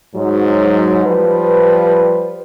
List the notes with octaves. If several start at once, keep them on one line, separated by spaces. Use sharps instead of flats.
G#2 F#3
F3 G3 B4